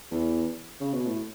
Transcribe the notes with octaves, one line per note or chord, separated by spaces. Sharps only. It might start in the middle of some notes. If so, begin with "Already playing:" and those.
E2
C#3
B2
A2